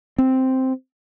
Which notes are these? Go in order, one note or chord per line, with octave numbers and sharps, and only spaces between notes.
C4